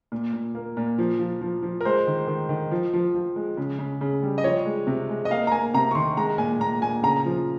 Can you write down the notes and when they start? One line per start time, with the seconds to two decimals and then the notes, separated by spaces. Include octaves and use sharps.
0.12 A#2
0.33 A#2
0.55 A#3
0.77 A#2
0.98 F3
1.19 F3
1.42 F3
1.63 F3
1.81 A#4
1.85 G#3 C5
2.07 D#3
2.27 D#3
2.49 D#3
2.71 F3
2.93 F3
3.15 F3
3.36 G#3
3.57 C#3
3.79 C#3
4.01 C#3
4.23 G3
4.38 D#5
4.44 F3 C#5
4.66 G#3
4.87 C3
5.09 G#3
5.25 D#5
5.31 A#3 F5
5.47 A#5
5.52 A#3 G#5
5.74 C3 A#5
5.91 C#6
5.95 D#3 C6
6.17 G#3 A#5
6.38 A#2 G#5
6.60 A#2 A#5
6.82 A#2 G#5
7.03 C#3 A#5
7.26 F3